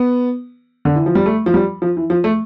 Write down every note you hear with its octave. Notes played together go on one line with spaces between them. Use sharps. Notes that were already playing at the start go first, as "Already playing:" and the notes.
Already playing: B3
D3
E3
F3
G3
A3
F3
G3
F3
E3
F3
A3